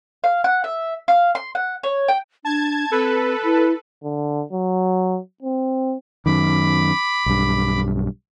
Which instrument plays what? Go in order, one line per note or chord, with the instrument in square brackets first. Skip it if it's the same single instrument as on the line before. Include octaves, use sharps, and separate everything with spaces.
[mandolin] F5
F#5
E5
F5
C6
F#5
C#5
G5
[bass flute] D4 [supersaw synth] A5 G#6
[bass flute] C4 [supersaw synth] A4 B4
[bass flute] E4
[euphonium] D3
F#3
C4
[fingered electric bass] F#2 D#3 [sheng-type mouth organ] B5 D6
[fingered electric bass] B1 G2